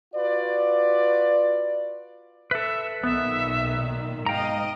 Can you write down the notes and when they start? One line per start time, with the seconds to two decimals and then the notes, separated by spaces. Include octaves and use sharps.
0.14 F4 F#4 B4 D5
2.51 A4 B4 E5
3.04 B1 A#2 D#3 B3 E5
4.26 G#2 D#5 F5 G5 A#5